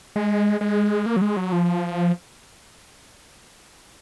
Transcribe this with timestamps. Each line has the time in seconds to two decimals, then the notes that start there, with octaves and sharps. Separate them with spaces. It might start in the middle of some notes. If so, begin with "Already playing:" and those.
0.16 G#3
0.61 G#3
1.06 A#3
1.16 F#3
1.22 G#3
1.37 F#3
1.52 F3